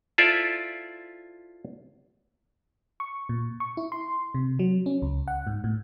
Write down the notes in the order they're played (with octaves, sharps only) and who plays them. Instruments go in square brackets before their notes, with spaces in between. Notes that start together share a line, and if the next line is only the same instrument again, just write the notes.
[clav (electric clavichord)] E4 F4 A4 C5 D5 E5
[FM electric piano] C#6
A#2
C#6
E4
C6
C3
F#3
C#4
C#2
F#5
G#2
A2